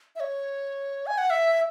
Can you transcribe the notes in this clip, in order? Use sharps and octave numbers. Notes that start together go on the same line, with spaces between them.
E5
C#5
G#5
F#5
E5